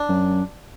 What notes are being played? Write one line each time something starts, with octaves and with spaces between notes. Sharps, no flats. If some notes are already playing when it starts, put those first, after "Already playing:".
Already playing: D4
F#2